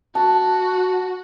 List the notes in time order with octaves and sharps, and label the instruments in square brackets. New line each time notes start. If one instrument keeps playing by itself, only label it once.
[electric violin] F#4 [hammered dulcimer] A5